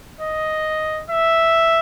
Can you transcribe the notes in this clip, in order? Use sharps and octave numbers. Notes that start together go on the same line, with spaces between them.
D#5
E5